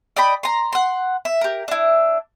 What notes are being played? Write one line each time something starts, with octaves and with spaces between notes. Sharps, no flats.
D5 D#5 G5 B5
A#5 C6
F#5 C6
E5
G4 A#4
D4 E4